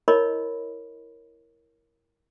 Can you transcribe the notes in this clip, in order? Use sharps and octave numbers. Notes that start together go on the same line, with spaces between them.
E4 A#4 C#5 D#5 B5 C#6